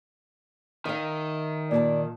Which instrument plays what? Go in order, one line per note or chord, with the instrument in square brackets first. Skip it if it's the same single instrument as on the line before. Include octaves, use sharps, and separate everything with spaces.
[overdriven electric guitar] D#3 [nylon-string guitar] E5 F5
[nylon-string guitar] A#2 C#5 A5 [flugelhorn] D5